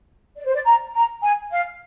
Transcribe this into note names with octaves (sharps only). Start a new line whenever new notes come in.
D5
C5
D5
A#5
A#5
G#5
F5